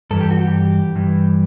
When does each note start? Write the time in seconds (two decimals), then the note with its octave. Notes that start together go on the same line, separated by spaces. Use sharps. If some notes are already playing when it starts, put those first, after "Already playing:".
0.11 G2 E3 A4
0.20 G4
0.31 F#4
0.39 G4
0.95 G2 E3